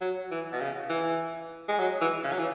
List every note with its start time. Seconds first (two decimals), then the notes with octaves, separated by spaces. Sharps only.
0.01 F#3
0.31 E3
0.52 B2
0.61 C#3
0.90 E3
1.68 G#3
1.79 F#3
2.01 E3
2.24 C#3
2.32 F#3
2.39 E3